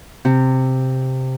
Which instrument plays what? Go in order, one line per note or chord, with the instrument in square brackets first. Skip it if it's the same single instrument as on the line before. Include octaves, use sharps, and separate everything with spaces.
[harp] C3